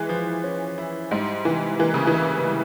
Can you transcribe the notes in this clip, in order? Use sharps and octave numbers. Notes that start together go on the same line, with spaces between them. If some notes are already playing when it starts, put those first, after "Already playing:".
Already playing: E3 G#3
F3
C#4
E4
G#2 G3
C3 E3
E3 A#3
C#3
E3
E4
G3